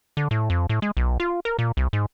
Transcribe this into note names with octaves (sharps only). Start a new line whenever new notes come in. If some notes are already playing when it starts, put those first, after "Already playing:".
D3
A2
F2
A2
G#3
B1
F4
A#4
A#2
C2
G#2